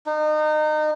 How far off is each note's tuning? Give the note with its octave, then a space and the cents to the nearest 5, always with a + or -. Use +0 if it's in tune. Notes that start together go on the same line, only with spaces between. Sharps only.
D#4 -30